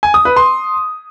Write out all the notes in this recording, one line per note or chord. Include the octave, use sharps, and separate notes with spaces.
G#5
D#6
B4
C6